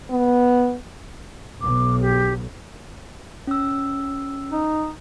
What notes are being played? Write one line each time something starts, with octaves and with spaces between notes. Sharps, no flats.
B3
B1 D6
G4
C#4 E6
D#4